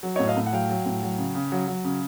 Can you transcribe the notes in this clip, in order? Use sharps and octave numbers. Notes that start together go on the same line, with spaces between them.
F#3
A2 C#5 D#5
D#5 F5
A2
F#5
F#3 F5 G5
F#3
A2
F#3
C#3
C#3
F#3
F#3
C#3